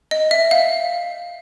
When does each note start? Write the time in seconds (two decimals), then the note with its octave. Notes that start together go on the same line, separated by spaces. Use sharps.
0.11 D#5
0.31 E5
0.51 F5